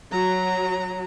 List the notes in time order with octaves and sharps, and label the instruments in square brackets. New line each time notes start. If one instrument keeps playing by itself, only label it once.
[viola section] F#3 [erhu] A#5